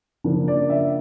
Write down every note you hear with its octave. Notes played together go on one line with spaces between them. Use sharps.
C#3 F3 A#3 D4
D5
E5